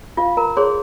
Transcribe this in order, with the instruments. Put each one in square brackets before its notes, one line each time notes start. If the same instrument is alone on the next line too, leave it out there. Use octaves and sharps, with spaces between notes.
[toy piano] F4 F5
A#4 A#5
G#4 C5 C#5 C6